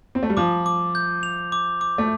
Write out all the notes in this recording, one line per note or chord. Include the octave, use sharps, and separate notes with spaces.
C4
A3
G3
F3 D6
D6
G6
F7
D6
D6
A3